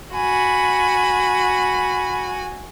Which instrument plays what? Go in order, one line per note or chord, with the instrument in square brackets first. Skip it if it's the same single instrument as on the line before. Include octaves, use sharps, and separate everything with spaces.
[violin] F#4 G#5 [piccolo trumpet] B5